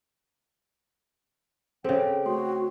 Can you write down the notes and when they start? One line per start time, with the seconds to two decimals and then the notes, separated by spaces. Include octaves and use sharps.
1.84 C#3 C4 G#4 A4 C5 G5
2.26 A3 F#4 C6